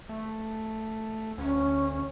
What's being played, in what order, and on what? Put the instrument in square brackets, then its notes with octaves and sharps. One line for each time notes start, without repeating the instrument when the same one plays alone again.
[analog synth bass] A3
[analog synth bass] D2 [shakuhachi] C#4